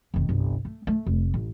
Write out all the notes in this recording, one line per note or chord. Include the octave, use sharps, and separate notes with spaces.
F1 D#3
G1 C2
A3
A3
F1
A1